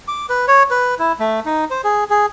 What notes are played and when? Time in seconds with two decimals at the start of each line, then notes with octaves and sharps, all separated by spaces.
0.08 D6
0.30 B4
0.48 C#5
0.71 B4
0.99 E4
1.20 A3
1.46 D#4
1.71 C5
1.84 G#4
2.10 G#4